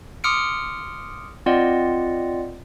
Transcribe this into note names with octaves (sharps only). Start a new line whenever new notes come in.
C6 D6 D#6 F6 C#7 D7
C4 F4 D5 D#5 F#5